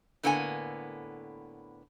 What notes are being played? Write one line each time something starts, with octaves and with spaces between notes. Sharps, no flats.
A2 D3 A#3 B3 F4 G#5